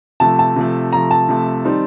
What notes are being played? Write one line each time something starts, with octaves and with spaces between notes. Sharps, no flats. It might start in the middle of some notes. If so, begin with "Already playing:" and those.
C3 F3 A3 A5
A5
C3 F3 A3
C3 F3 A3 A#5
A5
C3 F3 A3
D#3 G3 C4 D#4